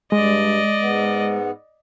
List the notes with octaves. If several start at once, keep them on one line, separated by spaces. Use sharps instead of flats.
G2 G#3 D5 D#5
G#2 B3